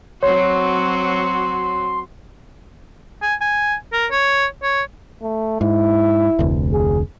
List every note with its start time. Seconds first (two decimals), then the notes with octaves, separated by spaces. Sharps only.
0.23 F#3 C4 F#4 C#5 C6
3.22 G#5
3.41 G#5
3.93 A#4
4.11 C#5
4.63 C#5
5.22 A3
5.61 G#2 E4
6.39 F1 D2
6.72 G#4